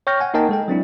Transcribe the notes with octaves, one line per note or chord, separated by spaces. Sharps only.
C#5 G5 C#6 F6 G6 A#6
F#5 G#5
A#3 D#4 A#4 D#5 G5 A5
G#3 A4 G5
F#3 C4 D4 E4